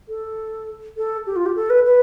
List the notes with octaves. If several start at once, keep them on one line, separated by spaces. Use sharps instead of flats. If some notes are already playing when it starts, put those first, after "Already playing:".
A4
A4
G4
F4
G4
A4
B4
B4